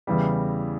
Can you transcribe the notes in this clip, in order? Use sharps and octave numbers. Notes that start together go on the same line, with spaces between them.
E2 C#3 E3 G3